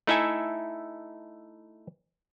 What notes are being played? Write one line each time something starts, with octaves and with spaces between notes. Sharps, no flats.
A3 D#4 E4 A4 E5 G#5